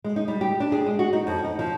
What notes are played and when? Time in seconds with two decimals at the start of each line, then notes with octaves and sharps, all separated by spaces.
0.04 G#3
0.16 D#4
0.28 G3
0.41 G4
0.60 D4
0.72 G#4
0.86 G#3
0.99 F#4
1.13 D#4
1.27 F2
1.44 D#4
1.59 F3